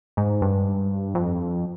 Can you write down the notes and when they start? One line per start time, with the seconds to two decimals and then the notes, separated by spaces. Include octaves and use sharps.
0.17 G#2
0.42 G2
1.15 F2